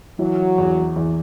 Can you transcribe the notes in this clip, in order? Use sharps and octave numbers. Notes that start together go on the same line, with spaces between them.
E3 F#3
E2
E2